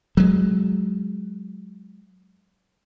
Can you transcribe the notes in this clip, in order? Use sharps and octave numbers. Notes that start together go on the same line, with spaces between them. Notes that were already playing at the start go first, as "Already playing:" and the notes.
F#3 G#3